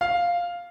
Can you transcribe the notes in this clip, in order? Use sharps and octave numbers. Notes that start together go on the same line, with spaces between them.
F5